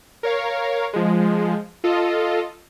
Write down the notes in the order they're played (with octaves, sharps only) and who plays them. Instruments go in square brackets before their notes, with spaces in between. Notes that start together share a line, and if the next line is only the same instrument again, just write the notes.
[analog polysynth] A#4 C#5 F5
F3 G#3
F4 A4 D#5